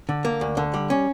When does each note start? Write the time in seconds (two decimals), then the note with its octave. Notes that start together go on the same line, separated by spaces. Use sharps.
0.09 D3
0.25 A#3
0.41 D2
0.57 D3
0.74 G3
0.90 C#4